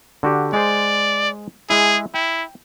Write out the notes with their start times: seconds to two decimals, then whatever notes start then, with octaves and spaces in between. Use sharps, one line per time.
0.23 D3 F#4 G4
0.53 G#3 G#4 C5 D5
1.70 G#3 E4 G#4
2.14 E4 G5